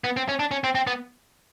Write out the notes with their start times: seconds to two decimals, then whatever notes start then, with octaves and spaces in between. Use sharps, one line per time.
0.04 B3
0.17 C4
0.29 C#4
0.39 D4
0.51 C#4
0.64 C4
0.75 C4
0.87 B3